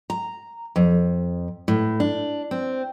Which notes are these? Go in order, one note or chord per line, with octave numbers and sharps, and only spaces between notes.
A#5
F2
A2
D4
C4